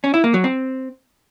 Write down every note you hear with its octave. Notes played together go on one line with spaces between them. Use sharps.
C#4
E4
A#3
F#3
C4